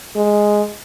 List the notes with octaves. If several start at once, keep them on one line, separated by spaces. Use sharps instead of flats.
G#3